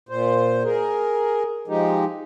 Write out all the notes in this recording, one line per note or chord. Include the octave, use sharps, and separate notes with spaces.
A#2 C5
G#4 A#4
F3 G#3 D#4 G4